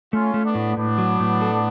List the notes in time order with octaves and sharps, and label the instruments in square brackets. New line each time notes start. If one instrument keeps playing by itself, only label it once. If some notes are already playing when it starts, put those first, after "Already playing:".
[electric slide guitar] A3 [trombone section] C#4 F4
[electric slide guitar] A3
[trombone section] B3 D4
[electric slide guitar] A2
[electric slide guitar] A2 [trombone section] B3 D4
[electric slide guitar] F#3
A2
A4